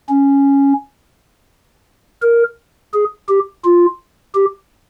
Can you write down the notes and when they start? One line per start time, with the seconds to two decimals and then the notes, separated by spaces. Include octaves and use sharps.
0.09 C#4
2.22 A#4
2.94 G#4
3.29 G4
3.65 F4
4.35 G4